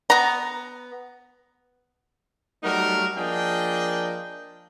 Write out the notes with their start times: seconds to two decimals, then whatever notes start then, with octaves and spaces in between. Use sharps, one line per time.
0.10 B3 A#5
2.64 F#3 G3 A3 D#4 A#4
3.17 F3 A#3 D4 G#4 D#5 G5